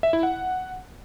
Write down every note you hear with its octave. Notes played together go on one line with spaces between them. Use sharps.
E5
E4
F#5